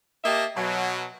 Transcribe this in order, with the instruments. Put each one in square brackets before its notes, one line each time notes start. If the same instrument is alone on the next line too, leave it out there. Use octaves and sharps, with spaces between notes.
[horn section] A#3 G4 D#5 E5 A5
B2 F#3